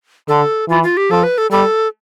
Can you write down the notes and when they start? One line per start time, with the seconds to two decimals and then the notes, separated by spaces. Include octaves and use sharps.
0.28 D3 A4
0.69 E3 F4
0.83 F4
0.97 G4
1.11 F3 A4
1.23 B4
1.38 A4
1.51 G3 A4